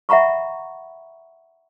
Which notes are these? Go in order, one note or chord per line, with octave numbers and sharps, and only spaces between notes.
E5 F#5 A#5 B5 C#6